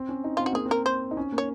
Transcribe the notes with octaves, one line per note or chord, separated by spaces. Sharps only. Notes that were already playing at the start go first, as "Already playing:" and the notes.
Already playing: C4
C#4
D#4
C4 F4
F#4
A#3 G#4
C4
A#4
C5
D#4
C#4
A#3
C#5